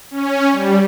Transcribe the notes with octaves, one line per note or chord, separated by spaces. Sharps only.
C#4
G3